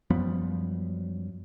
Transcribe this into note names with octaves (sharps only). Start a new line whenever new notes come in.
F#2 F3 G3 B3